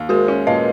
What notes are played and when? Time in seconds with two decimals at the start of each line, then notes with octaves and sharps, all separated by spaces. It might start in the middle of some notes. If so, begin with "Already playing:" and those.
Already playing: D#2
0.09 G#3 F#4 A#4
0.28 C#4
0.47 A#2 B4 D#5